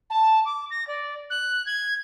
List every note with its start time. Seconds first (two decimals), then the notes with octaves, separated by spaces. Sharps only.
0.10 A5
0.45 D6
0.70 A#6
0.87 D5
1.30 F#6
1.66 G#6